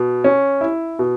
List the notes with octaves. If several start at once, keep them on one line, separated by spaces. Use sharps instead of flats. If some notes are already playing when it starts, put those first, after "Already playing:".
Already playing: B2
C#4
E4
B2